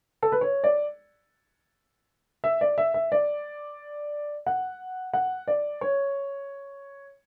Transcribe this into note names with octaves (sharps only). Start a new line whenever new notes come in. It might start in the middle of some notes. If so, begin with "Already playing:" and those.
A4
B4
C#5
D5
E5
D5
E5
E5
D5
F#5
F#5
D5
C#5